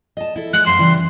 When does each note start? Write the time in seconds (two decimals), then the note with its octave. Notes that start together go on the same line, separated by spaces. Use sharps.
0.17 D#5 A5
0.36 E4 A4
0.53 G#3 F#6
0.66 F#2 F5 C6
0.78 C#3 E3 G3